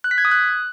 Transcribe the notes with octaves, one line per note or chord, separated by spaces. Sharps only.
F#6
B6
G#6
D#6
F#6